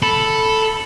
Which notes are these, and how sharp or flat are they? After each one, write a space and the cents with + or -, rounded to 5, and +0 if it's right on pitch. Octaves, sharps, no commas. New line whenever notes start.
A4 +0 B5 +0